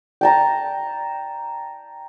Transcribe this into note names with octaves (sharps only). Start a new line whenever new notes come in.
G5 A5 A#5